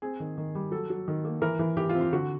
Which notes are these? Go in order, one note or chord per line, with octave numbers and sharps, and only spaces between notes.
C4 G#4
D#3
D#3
G3
F#3 A4
F#3
D#3
A#3
E3 A#4
E3
E3 G4
F4
C4
F4
D3 F#4